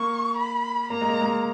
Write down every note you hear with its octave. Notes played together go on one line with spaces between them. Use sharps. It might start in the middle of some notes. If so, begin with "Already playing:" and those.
Already playing: A#3 C#6
B5
A#3 A#5
G#3
A#3
G#3
A#3